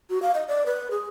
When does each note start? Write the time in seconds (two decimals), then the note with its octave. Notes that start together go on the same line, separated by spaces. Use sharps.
0.10 F#4
0.22 F5
0.34 D#5
0.48 D5
0.66 B4
0.91 G#4